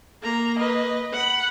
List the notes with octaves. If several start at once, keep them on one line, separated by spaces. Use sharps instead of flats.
A#3 A#5
B4 D#5
F#5 B5